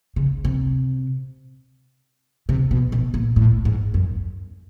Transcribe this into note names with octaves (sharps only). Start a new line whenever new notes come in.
C#3
C3
C3
B2
B2
A#2
A2
G#2
F#2